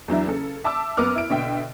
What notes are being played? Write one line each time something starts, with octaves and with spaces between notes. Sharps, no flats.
E2 F#3 D4 E4
C#3 A4
E5 A5 D6 E6
F#2 B3 A#4 D6 F6
E4 D7
B2 D3 E5 G5